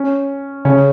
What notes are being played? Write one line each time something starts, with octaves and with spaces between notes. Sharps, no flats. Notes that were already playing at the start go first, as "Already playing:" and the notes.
Already playing: C#4
C#3 C#4